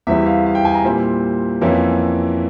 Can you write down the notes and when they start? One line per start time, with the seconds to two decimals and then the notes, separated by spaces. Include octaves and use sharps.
0.07 E2 E3 G3 C4 E4 E5
0.26 F5
0.46 F5
0.55 G5
0.65 G#5
0.74 A#5
0.84 A#2 G3 C4 E4
1.61 F2 E3 A#3 C#4 E4